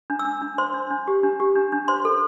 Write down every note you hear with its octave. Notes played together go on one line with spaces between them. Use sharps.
D4
E6
D4
D4
C5 C6
D4
D4
G4
D4
G4
D4
D4
C5 C6
A4